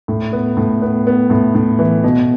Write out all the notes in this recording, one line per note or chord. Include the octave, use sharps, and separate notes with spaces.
A2
B3
A2
B3
B3
A2
A2
E3
B2